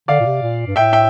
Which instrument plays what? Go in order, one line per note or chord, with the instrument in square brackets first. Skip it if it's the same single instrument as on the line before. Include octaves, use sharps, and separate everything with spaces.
[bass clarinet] D3 [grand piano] D5 F5
[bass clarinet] A#2
C3
A#2
G2
[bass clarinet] A2 [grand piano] E5 G5
[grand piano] E5 G5